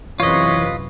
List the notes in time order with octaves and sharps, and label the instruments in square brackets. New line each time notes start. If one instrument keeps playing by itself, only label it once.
[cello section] F#2 C3 B4 [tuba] E3 [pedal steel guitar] F4 D#5 [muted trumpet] C#5